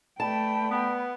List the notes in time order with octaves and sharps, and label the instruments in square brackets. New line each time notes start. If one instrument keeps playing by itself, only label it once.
[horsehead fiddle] A3 G5 [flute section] B4 D5 B5 [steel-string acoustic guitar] A5
[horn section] B3